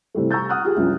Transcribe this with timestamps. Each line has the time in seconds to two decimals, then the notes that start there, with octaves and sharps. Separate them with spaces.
0.15 C3 E3 G3 A3
0.31 A#5 C#6 E6 G6 A6
0.50 F#5 D#6 F6 F#6
0.64 F4 G4 G#4
0.77 C2 F#2 F3